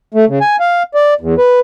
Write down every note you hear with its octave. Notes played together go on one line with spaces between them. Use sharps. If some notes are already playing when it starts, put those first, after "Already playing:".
A3
C#3
G#5
F5
D5
E2
B4